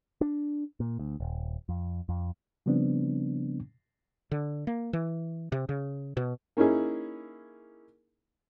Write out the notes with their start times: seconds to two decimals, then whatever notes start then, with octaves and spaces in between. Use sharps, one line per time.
0.21 D4
0.80 A#2
0.99 D2
1.20 D#1
1.69 F2
2.09 F2
2.66 C#3 F3 G3 B3 C4 D4
4.31 D3
4.67 A#3
4.93 E3
5.52 C3
5.69 C#3
6.17 B2
6.57 A#3 C#4 D#4 E4 G#4